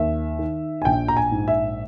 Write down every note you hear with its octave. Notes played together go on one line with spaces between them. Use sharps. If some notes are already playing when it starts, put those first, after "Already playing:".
Already playing: D#2 E5
D#3
G#5
A#1 G5
A#5
G#5
G#2
E5